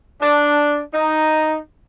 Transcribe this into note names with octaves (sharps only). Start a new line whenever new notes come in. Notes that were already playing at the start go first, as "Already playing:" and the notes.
D4
D#4